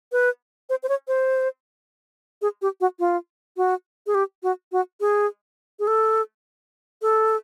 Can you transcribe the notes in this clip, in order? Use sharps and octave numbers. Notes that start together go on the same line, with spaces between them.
B4
C5
C5
C#5
C5
G#4
G4
F#4
F4
F#4
G#4
G4
F#4
F#4
G#4
G#4
A4
A4